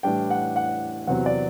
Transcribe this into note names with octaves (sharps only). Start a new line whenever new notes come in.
A2 E3 G3 D4 G5
F#5
F#5
E2 C3 F#3 C4 F#5
D5